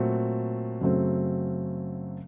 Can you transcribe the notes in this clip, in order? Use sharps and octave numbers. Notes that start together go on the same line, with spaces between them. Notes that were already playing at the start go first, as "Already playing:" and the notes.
Already playing: A#2 F#3 A3 C4 F#4
F#2 C#3 F#3 A3 C4